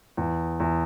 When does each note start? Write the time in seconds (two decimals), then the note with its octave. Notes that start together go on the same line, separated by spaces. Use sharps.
0.17 E2
0.60 E2